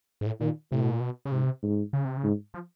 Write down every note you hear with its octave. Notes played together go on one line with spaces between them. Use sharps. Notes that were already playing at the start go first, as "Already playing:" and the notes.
G#2
A2
A#2 D#3
A2 C3
B2
A#2
B2
C#3
G#2 C3
G#2
C#3
C3
C#3
G#2
F3